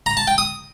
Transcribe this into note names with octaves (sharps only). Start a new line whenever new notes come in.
A#5
A5
G5
D#6